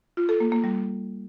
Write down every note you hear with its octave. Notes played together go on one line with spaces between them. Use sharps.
F4
A4
A#3
A#3
G3